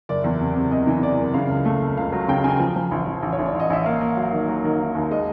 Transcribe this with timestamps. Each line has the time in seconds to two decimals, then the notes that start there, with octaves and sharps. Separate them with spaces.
0.09 F#1 D5
0.24 E2
0.40 C3
0.56 C3
0.71 C3 D#5
0.87 E3
1.03 C3 D5
1.19 F#1
1.34 C#3 F5
1.50 C#2
1.65 A3
1.82 A3
1.97 C#2 F5
2.12 F#3
2.28 C#3 G5
2.44 C#3 G#5
2.60 F3
2.76 F3
2.91 A1
3.07 A1
3.22 A1
3.33 C#5
3.39 A1
3.46 D5
3.54 A1
3.60 D#5
3.70 A1 E5
3.86 A#3 F5
4.01 A#3
4.17 F#3
4.32 D#3
4.48 F#3
4.64 D#3
4.80 D#3
4.95 D#2
5.11 G#3 D#5